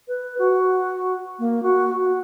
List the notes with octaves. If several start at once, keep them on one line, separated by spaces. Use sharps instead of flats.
B4
F#4
A#3
F#4
F#4